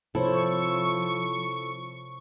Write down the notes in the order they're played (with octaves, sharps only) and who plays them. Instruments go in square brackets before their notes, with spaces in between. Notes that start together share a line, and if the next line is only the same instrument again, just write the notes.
[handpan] C3 C5 C#5 [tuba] F3 [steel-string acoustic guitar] E4 A4 [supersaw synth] C#6